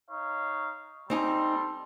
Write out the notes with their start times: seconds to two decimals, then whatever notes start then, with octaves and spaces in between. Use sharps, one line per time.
0.10 D#4 C#5 F5
1.10 G3 C4 D#4 A4 G#5 C6